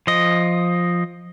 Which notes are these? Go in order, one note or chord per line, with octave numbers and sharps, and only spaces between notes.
F3 D#5